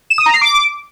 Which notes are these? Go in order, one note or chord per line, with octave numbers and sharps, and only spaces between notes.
E7
D#6
A#5
C7
D6